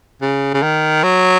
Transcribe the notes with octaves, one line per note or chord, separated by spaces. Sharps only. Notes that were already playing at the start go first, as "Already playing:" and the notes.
C#3
C#3
D#3
F#3